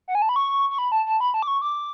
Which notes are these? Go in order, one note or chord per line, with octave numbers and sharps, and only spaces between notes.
F#5
G#5
A5
B5
C#6
C#6
B5
A5
A5
B5
A5
D6
C#6
D6